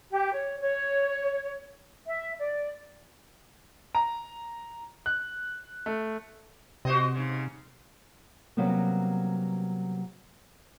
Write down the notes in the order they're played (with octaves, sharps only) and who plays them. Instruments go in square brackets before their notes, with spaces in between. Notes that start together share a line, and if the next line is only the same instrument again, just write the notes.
[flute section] G4
C#5
C#5
E5
D5
[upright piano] A#5
F#6
A3
[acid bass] C3 [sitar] F#4 C5 D#5
[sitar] G#2 C#3
[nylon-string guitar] C3 F#3 G3 A#3 B3